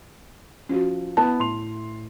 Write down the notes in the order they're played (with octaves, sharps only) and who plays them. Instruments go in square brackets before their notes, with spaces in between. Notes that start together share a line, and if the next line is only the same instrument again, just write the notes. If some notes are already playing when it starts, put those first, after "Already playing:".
[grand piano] F3 [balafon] C#4 F#4
[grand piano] B3 E4 [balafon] A5
[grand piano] A2 C6 F7